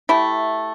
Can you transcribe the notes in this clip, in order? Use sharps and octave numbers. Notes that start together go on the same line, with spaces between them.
A3 E4 G4